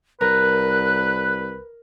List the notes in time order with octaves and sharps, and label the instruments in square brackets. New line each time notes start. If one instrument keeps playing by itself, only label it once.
[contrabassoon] C2 [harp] A#4 [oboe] B4 [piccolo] F#6